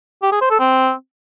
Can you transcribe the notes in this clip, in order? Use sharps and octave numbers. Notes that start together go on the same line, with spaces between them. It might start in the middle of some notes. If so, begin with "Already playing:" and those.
G4
G#4
C5
A4
C4